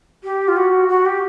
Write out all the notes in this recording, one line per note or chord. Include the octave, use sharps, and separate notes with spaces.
G4
F4
F#4
F#4
G4